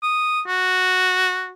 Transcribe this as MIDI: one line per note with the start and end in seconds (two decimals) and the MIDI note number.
0.03 0.41 87
0.47 1.52 66